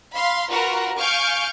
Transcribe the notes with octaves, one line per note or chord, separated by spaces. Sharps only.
F5 B5 C6
F4 F#4 A#4 B4 F#5 A#5
F5 G#5 C#6 F6 G6 D7